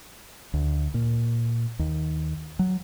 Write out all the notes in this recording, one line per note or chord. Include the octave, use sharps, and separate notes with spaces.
D2
A#2
D#2
F#3